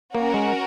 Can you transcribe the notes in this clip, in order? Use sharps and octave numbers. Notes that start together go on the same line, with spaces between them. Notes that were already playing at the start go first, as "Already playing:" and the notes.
A#3 C#4 F#4 A#4
G#3